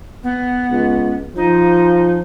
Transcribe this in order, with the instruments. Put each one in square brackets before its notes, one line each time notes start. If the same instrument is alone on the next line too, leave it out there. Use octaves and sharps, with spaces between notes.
[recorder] B3
[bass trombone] C#2
[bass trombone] F3 [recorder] D#4